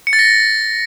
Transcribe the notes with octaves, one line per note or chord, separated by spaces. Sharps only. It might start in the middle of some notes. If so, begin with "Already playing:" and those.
C#7
A6
A#6